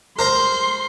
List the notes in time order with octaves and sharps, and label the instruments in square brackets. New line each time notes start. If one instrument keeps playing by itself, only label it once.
[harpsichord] A#4 C5 A#5 [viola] C6